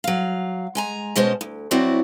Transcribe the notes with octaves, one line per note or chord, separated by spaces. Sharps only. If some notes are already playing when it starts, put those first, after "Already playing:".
F#3 F5
G#3 G#5 A#5
B2 G#3 C#4 C5 D#5 A5
D2
F#3 C4 E4 F#4 D5